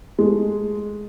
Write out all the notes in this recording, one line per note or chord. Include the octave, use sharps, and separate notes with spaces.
G#3 A3